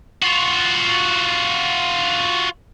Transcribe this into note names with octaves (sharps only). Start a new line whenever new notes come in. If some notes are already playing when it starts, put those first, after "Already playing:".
F4 F#4